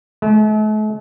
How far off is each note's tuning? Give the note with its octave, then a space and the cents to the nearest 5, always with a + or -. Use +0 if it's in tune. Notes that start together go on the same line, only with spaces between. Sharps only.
A3 -45